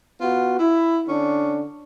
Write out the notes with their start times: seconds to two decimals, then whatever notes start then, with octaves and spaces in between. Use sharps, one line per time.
0.21 B3 F4 F#4
0.59 E4
1.07 D3 C#4 D4